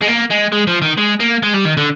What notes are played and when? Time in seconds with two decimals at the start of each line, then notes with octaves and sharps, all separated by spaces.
0.02 G#3
0.07 A#3
0.30 G#3
0.52 G#3
0.67 F3
0.82 D#3
0.98 G#3
1.20 A#3
1.43 G#3
1.54 G3
1.65 D#3
1.77 D3